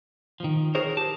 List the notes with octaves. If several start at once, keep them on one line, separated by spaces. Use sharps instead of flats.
D#3 F3
G#4 A#4 C5 C#5
G4 A5